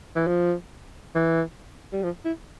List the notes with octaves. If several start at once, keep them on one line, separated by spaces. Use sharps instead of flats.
E3
F3
E3
G3
F3
E4